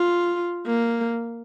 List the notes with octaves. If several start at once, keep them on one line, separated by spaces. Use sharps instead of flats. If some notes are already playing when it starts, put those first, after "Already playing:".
Already playing: F4
A#3